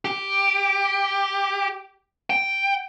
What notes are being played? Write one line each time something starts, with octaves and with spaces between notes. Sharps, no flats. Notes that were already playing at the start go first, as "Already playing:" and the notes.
G4
G5